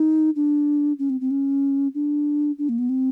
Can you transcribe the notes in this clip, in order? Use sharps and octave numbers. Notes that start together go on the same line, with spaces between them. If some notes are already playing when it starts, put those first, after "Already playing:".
Already playing: D#4
D4
C#4
C4
C4
C#4
D4
D4
A#3
B3
C4